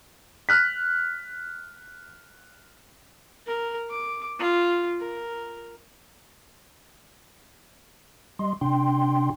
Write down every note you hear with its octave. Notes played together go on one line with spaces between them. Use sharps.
F6 F#6 B6
A#4
D6
F4
A#4
G3 D#5 C6
C3 D4 G5 C6